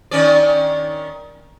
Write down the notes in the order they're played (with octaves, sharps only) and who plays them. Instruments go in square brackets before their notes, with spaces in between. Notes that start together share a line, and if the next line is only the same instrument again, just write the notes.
[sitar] D#3 C#4 D5